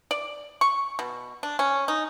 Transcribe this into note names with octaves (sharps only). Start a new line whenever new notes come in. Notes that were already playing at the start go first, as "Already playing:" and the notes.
D5
C#6
B2
D4
C#4
D#4